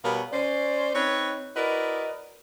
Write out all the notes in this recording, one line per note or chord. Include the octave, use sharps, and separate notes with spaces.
B2 G3 B3 A#4 C#5 F5
C#4 C5 D5
C4 D#4 B4 C#5
E4 F#4 A#4 B4 D5 D#5